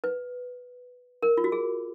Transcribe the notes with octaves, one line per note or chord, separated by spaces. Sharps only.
B4
A#4
F4
F#4
G#4